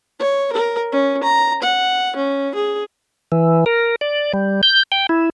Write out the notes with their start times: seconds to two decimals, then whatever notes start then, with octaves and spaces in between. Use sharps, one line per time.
0.19 C#5
0.52 A#4
0.92 C#4
1.23 A#5
1.62 F#5
2.16 C#4
2.55 G#4
3.32 E3
3.66 A#4
4.01 D5
4.33 G3
4.63 G6
4.92 G5
5.09 E4